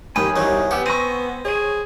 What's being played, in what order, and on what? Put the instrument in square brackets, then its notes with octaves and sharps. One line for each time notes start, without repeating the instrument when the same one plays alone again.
[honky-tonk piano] G1 D#3 G4 [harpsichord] G5 [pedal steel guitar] G#5 B5 D#6
[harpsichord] C2 F#3 [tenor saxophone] D#4
[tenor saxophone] B3 [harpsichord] G4 [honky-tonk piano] F#5 D6 E6
[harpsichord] C4 [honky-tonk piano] C#6 A#6 D#7
[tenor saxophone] G#4 [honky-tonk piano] C#5 D#7